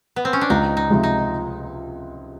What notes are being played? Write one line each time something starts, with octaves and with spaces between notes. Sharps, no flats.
B3
C4
C#4
D4
C#2 D#4
D#4
C3 F3 G#3
D#4